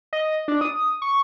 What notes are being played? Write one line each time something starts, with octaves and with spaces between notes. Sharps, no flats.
D#5
D4
D#6
C#6